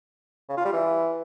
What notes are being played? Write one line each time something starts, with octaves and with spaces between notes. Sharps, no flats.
C#3
F4
G3
E3